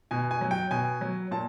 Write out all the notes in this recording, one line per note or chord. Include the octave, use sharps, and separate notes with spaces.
B2 G#5
G#5
F#3
G5
B2 G#5
F#3
A#2 A5